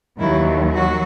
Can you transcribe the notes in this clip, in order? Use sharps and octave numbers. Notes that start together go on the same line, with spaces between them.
D#2 D#3 E3 F#3 E4
F#3 F#4